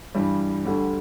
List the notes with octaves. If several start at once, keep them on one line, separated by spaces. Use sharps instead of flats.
G2 E3 G3
D2 D3 G3